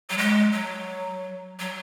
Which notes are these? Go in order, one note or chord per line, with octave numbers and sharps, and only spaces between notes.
F#3
G#3
F#3
F#3